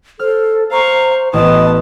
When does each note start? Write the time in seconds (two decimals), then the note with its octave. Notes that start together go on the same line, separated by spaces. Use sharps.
0.19 A4 C5 F6
0.71 C5 F5 A#5 C#6
1.33 A1 B3 D#5 A5 D#6